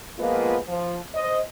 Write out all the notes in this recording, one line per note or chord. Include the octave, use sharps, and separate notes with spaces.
F3 G#3 A#3 B3 F4 B4
F3
C5 D#5